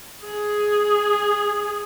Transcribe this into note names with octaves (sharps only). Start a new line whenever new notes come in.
G#4